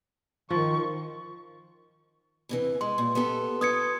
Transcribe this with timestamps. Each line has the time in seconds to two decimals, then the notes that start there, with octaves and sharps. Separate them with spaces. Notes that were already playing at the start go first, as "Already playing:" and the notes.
0.50 D#3 F3 C#6
2.49 E2 C3 E3
2.81 G#3 C6
2.98 A#2
3.15 B3 G4 A4
3.61 F4 A4 B4 D#6 G#6 C#7